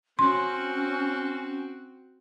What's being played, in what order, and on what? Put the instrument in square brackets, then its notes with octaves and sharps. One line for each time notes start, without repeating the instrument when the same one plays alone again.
[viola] C4 F#4 [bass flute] C#4 [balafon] C6